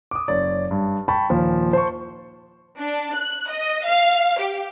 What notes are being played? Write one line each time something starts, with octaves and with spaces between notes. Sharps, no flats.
D6 D#6
F#1 C#5 D5
G2
G5 A5 B5 C#6
D#2 A#2 F3
C5 A5 C#6
D4
F#6
D#5
F5
G4